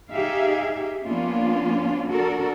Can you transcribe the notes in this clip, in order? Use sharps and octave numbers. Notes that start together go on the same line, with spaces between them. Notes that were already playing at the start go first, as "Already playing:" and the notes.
D#4 G4 G#4 E5 F5
F3 A#3 B3 C#4 D4 F4
D4 F#4 A4 A#4